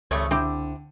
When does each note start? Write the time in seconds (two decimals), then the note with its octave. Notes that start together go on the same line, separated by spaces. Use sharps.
0.11 G#1 C#2 G3 A3 C#5 C#6 D#6
0.31 D3 C4 E4 G4